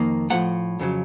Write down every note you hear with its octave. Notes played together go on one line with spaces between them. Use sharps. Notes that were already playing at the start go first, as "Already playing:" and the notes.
Already playing: F2 D#3 A#3
A2 F3 A#3 F#5
F2 C#3 F#3